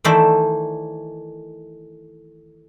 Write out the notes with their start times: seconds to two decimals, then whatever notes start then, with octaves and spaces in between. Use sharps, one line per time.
0.04 D#3 E3 A3 C5 D5 E5